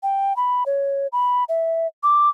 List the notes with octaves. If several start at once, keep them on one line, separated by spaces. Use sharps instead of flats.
G5
B5
C#5
B5
E5
D6